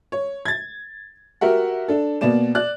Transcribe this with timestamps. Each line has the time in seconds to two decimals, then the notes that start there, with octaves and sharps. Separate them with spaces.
0.12 C#5
0.45 G#6 A6
1.41 F#4 G4 A#4 E5 F#5
1.88 D4 A4
2.21 B2 A#3 B3 D5 E7
2.55 D5 F#6